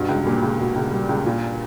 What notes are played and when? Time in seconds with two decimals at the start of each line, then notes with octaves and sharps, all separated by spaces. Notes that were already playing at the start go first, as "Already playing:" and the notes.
Already playing: G2 B2
0.09 C#2
0.26 A#2 G3
0.42 C#2
0.59 B2
0.76 C#2
0.92 G3
1.09 C#2
1.26 A#2